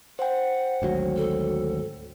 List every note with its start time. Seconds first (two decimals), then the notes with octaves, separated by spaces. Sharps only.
0.19 C5 F#5 G5
0.82 G#1 D2 F#3
1.17 A4